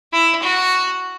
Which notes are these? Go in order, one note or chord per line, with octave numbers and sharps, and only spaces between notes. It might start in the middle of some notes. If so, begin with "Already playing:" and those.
E4
F#4